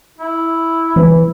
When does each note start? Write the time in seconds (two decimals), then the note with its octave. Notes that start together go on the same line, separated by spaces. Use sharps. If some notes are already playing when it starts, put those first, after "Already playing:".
0.19 E4
0.96 E3